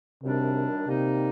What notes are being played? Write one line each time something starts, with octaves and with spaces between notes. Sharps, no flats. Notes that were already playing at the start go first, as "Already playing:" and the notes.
F#2 C3 D#3 G3 D4
C3 D#3 G3 A#3 D#4